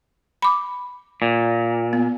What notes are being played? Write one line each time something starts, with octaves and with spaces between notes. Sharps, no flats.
B5 D6
A#2
B3